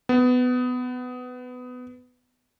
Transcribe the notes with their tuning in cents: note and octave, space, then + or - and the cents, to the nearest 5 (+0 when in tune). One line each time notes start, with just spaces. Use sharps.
B3 +20